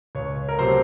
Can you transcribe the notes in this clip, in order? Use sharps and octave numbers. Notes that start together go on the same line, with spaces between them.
C#2 C#5
A#4
C3 F#3 A3 C5